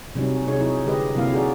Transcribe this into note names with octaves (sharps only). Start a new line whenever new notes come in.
C3 F#3 G3 C#4 D#4
C3 C#4 D#4 G#4 C#5
F#3 D#4 E4
D3 G#3 G4 B4 D#5
C3 F#3 A#3 E4 F5
D#4 F#4 G#4 A#4 D5